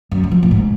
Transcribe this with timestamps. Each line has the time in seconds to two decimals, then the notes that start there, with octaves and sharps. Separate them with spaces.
0.11 F#2
0.24 F#3
0.32 F3
0.43 A#2
0.51 G#2